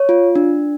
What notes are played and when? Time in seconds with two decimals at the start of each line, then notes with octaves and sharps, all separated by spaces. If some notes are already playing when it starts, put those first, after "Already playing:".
Already playing: C#5
0.09 F4
0.36 D4